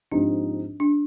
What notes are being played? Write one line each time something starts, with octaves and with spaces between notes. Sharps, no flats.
G#2 F3 C4 D4 D#4 G4
D4